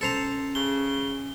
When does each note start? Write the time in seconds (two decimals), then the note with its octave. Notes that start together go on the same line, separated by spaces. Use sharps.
0.01 C#4 A4 C5 A#5
0.55 C#3 G7